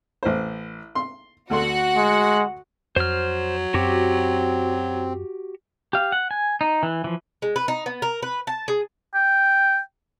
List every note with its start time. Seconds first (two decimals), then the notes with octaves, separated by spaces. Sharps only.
0.23 A1 C5
0.95 C6
1.50 D2 F#4 A4 F#5 C6
1.97 G#3
2.96 F2 F#3 C5 F6
3.74 F#2 C4 F#4 G4
5.93 G4 F5
6.12 F#5
6.31 G#5
6.61 D#4
6.83 E3
7.04 E3 F3
7.42 G#3
7.56 B4
7.68 D#4
7.86 B3
8.02 A#4
8.22 B4
8.47 A5
8.68 G#4
9.14 G5